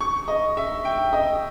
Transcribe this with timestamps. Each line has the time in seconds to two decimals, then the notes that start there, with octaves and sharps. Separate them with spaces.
0.01 C#6
0.28 D#5
0.57 E5
0.85 G5
1.13 D#5